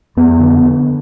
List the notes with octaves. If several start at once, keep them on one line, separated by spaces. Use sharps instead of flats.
F2 B3
D3
D3